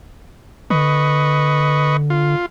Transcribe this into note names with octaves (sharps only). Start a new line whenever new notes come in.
D3 B4 D#5 C#6
F4